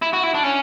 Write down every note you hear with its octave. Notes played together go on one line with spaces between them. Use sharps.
E4
F#4
E4
D4
C#4